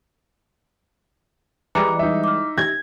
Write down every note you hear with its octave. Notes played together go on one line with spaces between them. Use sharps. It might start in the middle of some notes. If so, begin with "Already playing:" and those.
E3 G3 G#3 A#5 D6 F#6 C#7
D#4 E5
D6 F6
G#6 A#6